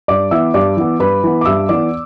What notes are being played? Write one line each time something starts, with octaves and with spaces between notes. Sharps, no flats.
G2 D5 D6
E3 B3 E5 E6
G2 D5 D6
E3 B3
G2 B4 B5
E3 B3
D6
G2 E5 E6
E3 B3 D5 D6